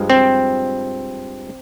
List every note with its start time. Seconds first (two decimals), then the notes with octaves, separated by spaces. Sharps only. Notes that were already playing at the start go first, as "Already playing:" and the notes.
Already playing: G2 F3 G#3
0.10 C4